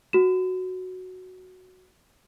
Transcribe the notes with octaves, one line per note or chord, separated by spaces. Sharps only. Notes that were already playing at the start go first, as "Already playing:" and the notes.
F#4 E7